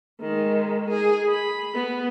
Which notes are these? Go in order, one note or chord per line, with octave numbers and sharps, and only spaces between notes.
D#3 G#3
G#4
B5
B3